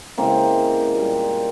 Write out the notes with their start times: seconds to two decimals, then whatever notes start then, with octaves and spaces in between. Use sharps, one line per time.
0.18 C#3 E3 G#3 A#3 C4
0.94 A#2 G3